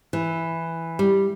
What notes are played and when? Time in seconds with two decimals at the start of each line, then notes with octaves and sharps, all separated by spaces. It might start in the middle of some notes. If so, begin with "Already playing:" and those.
0.13 E3
0.99 G3